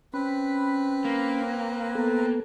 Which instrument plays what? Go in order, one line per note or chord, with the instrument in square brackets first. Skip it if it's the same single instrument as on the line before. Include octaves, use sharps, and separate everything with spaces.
[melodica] C4 B4 [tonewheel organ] C#4 B5
[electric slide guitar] A#3
[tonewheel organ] B3 A4